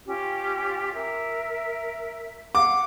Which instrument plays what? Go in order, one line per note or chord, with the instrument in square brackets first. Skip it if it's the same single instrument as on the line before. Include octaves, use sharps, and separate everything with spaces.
[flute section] C#4 F4 G4
A#4 E5
[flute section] F5 F#5 [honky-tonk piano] D6